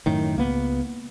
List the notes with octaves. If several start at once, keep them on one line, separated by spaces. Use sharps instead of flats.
F#2 A2 D#3
C#2 A#3 B3